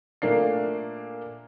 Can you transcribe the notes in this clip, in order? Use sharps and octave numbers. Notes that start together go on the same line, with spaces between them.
A#2 A3 A#3 D4 C7